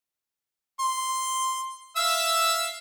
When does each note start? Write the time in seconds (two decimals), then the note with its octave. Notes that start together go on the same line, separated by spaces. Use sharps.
0.79 C6
1.97 E5 F5 E6